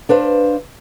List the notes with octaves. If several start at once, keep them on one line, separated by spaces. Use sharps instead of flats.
D4 B4 C5 F5